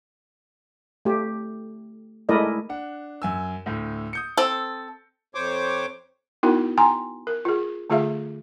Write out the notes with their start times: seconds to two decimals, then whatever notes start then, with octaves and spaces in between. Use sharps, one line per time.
1.05 A3 G4
2.29 G#3 A3 E4 A#4 D5 D#5
2.69 D4 F#5
3.22 F#2 G#5 E6
3.66 D2 A2
4.13 D#6 G6 C#7
4.37 C4 A4
5.35 F2 C5 C#5 D6
6.43 B3 D#4 E4 F#4 A#4 G5
6.78 G5 G#5 A#5 C6
7.27 A#4
7.45 F4 G#4
7.90 D3 A3 F4 G#4 E5 F5